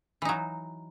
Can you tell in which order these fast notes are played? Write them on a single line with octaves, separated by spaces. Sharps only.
E3 D#4 F#3